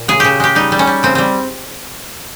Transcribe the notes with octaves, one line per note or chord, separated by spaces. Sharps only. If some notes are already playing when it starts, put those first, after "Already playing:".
Already playing: A#2
C#3 G#4
C#3 G4
G#3 G4
G3 D#4
G3
C#4
G3
C#3 C4
G3 C4